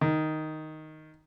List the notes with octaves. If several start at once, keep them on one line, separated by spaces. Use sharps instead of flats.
D#3